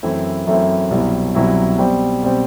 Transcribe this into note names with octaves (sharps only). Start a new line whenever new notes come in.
F#2 E3 A3 C4 E4
F#2 E3 A3 C4 E4
C2 B2 F#3 C4 E4
C2 B2 F#3 C4 E4
B2 G3 C4
B2 G3 C4